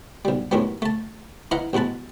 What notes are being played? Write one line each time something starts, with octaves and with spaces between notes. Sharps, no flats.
B1 G3
D#2 A2 D#3 F#3 G#3 B3
A3 A5
E3 E4 D#5 F5 F#5 A#5
A1 B2 G#3 B4 A5